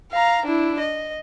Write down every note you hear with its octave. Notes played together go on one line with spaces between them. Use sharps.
F5 A#5
D4 E4
D#5